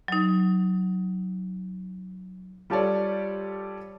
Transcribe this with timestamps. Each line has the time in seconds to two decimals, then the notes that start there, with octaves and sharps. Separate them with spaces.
0.08 F#3 D#4
2.70 G3 F4 G4 A4 C#5 D5